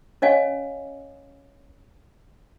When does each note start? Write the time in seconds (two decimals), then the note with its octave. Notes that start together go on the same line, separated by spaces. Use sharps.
0.22 C#4 C#5 D#5 F5 G#5